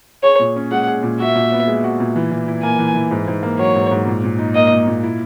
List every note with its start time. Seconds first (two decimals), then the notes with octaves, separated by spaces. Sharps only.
0.23 G#4 C#5
0.40 A#2
0.56 C#4
0.71 G#3 F#5
0.87 G#4
1.03 A#2
1.20 F#4 E5
1.35 A#2
1.52 B3
1.68 G#3
1.84 F#4
2.00 A#2
2.16 E3
2.31 E3
2.48 E4
2.63 A#3 G#5
2.79 E3
2.95 E3
3.11 G#2
3.28 G#2
3.43 A#3
3.59 F#3 C#5
3.75 G#2
3.91 G#2
4.07 A#2
4.24 A#2
4.39 D#4
4.55 A#3 D#5
4.71 A#2
4.87 A#2
5.03 E4